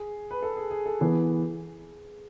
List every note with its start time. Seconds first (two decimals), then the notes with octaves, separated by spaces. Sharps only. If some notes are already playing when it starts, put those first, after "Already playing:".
Already playing: G#4
0.31 B4
0.42 A4
0.57 G#4
0.71 G#4
0.86 A4
1.00 E3 B3 G#4